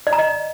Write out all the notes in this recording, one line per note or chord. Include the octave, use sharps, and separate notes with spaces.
D5
A#5
D#5